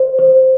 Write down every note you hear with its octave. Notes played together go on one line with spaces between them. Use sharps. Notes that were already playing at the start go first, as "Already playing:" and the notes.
Already playing: C5
C5